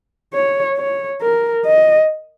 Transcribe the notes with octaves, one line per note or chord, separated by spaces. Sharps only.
C#5
C#5
A#4
D#5